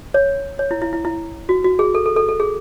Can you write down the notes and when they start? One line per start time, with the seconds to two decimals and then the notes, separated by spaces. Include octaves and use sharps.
0.14 C#5
0.59 C#5
0.71 E4
0.82 E4
0.93 E4
1.05 E4
1.49 F#4
1.64 F#4
1.79 G#4
1.95 A4
2.06 A4
2.16 A4
2.29 A4
2.40 G#4